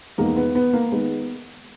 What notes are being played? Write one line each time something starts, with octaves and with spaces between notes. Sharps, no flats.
E2 D#3 G#3 A#3
B3
B3
A#3
D#3 G#3 B3